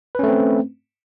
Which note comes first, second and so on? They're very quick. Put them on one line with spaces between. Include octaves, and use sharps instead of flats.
B4 C#4 A3 C4